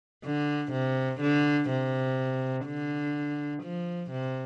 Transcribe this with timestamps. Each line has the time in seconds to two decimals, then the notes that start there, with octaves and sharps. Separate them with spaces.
0.24 D3
0.72 C3
1.21 D3
1.69 C3
2.66 D3
3.63 F3
4.11 C3